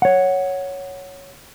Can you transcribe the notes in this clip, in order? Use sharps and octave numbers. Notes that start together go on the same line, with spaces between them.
C#5 F#5